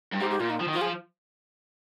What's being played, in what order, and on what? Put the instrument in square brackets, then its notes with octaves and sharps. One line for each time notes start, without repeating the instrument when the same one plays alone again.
[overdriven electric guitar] G2
[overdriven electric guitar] G#2 [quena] G4
[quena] G4
[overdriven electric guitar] A#2 [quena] F4
[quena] D#4
[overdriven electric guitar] F3
D#3
[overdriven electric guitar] F3 [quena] F4
[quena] G#4